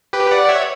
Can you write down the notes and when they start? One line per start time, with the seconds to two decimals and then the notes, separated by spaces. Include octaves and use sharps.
0.13 G4 B4
0.31 D5 F#5
0.49 C#5 E5